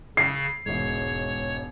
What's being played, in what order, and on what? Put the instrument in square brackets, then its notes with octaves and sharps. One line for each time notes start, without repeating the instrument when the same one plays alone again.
[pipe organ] C#3 [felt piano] C7
[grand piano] E1 G#2 [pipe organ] C#5